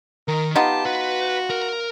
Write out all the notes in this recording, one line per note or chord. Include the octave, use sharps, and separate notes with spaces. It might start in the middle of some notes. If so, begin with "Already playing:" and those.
D#3 A#4
B3 D#4 F4 G4 A5
F#4 B4
A#4